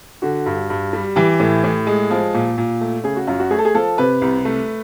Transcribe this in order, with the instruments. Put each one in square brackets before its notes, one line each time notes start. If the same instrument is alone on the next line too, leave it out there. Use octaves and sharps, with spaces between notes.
[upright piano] D3 F#4
G2
G2
G3
E3 G4
A2
A2
G#3
F3
A#2
A#2
A3
C#3 G#4
F#4
F#2 F4
F#4
A3 G#4
A4
G#4
F3 A4
C3 B4
C2
A3